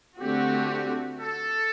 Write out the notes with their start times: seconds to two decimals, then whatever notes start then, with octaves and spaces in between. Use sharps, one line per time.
0.19 D3 A3 C4 F#4 G4
1.20 A4